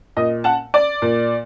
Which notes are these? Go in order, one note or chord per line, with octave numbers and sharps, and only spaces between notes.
A#2 D#5
F#5 A5
D5
A#2